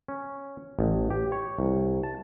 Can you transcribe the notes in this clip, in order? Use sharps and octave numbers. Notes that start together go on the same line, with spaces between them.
C#4
A1
G4
C#5
C2
A5